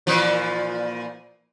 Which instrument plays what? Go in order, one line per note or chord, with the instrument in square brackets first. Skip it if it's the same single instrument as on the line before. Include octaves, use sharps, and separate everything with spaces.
[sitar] A#2 E3 F3